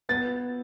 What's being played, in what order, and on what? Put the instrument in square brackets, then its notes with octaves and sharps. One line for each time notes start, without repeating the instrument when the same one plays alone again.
[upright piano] B3 A6